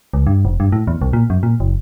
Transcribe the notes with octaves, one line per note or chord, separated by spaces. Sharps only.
C#2
G2
F1
G2
A2
E2
C2
A#2
F#2
A#2
F#1